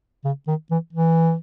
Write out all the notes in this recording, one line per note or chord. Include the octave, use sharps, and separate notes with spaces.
C#3
D#3
E3
E3